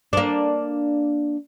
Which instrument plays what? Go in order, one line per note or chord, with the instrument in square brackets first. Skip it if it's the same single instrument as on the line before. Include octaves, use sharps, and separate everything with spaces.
[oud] A#3 D4